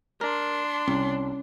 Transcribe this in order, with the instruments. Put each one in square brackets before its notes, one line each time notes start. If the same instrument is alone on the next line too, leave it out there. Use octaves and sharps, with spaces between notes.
[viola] D4 C6 [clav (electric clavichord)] A#4
[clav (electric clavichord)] C2 [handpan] C#4